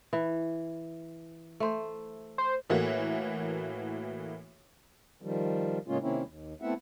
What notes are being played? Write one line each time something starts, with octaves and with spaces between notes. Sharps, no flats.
E3
A3 C5
C5
A2 E3 A3 A#3 F#4
D#3 F3 G3
A2 C#3 G#3 A#3 C#4 F4
C3 D#3 A#3 C4 C#4 E4
D#2
A3 B3 C4 E4 E5 F#5